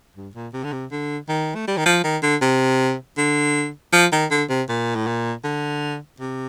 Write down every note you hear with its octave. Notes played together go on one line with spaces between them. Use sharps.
G2
A#2
C3
D3
C3
D3
D#3
A3
G3
D#3
F3
D#3
D3
C3
D3
F3
D#3
D3
C3
A#2
A2
A#2
D3
C3